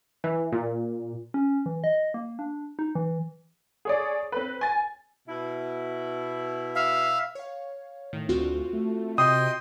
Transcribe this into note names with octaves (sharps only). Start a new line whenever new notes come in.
E3
A#2
C#4
E3
D#5
A#3
D4
D#4
E3
G#4 C#5 D5
C4 B4
G#5 A6
B2 E4
E5 F5
C#5 F5
A2 D#3
D2 C4 F4 F#4
A3
C3 D#5 G5 C6 D#6